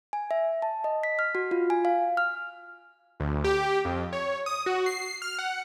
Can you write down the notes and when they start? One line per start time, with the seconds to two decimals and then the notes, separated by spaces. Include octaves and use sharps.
0.13 G#5
0.31 E5
0.62 A5
0.84 D#5
1.03 B6
1.19 F6
1.35 F#4
1.51 F4
1.70 G#5
1.85 F5
2.17 F6
3.20 D2
3.44 G4
3.85 F2
4.13 C#5
4.46 D#6
4.66 F#4
4.86 C7
5.22 F6
5.39 F#5